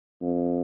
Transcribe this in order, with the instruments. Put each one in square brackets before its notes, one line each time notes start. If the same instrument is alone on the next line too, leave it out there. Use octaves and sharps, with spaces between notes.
[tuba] F2